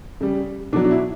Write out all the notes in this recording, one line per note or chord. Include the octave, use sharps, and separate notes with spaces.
C#3 G3
B2 F#3 D4
D4
E4